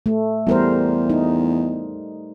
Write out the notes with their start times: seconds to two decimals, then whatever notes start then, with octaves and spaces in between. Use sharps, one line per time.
0.06 A3
0.47 E2 G3 A#4 C5
1.10 D#4